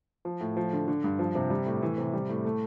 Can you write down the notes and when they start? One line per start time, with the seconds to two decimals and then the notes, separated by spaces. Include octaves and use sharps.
0.25 F3
0.41 A2
0.57 F3
0.73 D3
0.88 D3
1.04 G2
1.19 F3
1.35 C3
1.50 G3
1.66 A2
1.82 E3
1.98 C3
2.13 G3
2.29 A2
2.45 A3